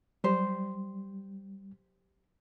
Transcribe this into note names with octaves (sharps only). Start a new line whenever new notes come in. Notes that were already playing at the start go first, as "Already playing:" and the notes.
F#3 G3 G4 C5